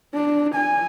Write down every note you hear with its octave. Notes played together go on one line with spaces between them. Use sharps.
D4
G#5